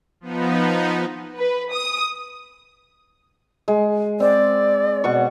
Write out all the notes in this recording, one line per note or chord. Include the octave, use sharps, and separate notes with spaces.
F3 B3 D#4
B4
D#6
G#3
C4 D5
B2 F#5 C#6